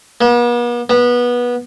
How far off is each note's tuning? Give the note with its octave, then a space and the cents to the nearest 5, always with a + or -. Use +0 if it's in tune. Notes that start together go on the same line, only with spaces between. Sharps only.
B3 -45
B3 -20